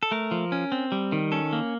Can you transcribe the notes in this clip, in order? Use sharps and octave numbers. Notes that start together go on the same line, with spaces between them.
A4
A3 A#4
F3
C#4
C4
G3
D#3
C#4 A4
A#3